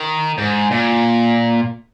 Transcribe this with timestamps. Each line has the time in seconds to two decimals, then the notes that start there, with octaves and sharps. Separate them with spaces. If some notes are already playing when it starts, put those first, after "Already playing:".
Already playing: D#3
0.38 G#2
0.71 A#2